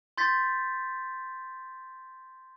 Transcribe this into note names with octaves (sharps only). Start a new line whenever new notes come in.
C6 G6 A6 B6